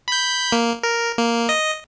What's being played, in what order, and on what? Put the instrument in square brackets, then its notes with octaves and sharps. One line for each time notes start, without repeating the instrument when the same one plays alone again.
[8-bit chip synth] B5 G6
A#3
A#4
A#3
D#5